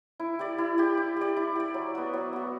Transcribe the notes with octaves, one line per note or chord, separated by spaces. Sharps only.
E4
G4 D5
E4
G4 D5
E4
G4 D5
E4
G4 D5
F#3
B3 F#4
F#3
B3 F#4